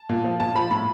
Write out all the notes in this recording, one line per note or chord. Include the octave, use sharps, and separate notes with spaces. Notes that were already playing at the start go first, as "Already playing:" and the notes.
Already playing: A5
A#2
F3
A#2 A5
F3 B5
A2 B5